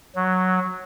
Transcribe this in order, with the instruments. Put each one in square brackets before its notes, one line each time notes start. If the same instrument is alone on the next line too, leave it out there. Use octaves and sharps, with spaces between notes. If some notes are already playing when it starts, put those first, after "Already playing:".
[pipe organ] F#3